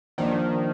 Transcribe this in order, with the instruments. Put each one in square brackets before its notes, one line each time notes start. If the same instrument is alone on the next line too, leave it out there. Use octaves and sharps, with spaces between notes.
[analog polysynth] D#3 [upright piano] F3 A#3 D4